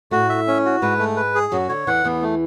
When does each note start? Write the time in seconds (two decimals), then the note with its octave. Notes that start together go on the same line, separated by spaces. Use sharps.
0.11 A2 A3 F#4
0.29 E5
0.47 C#4
0.65 F#4
0.82 G#2 G#3 B4
0.99 A3
1.16 B4
1.35 G#4
1.52 F#2 F#3 F#4
1.69 D3 C#5
1.87 E2 E3 F#5
2.04 E2 E3 B3
2.22 A3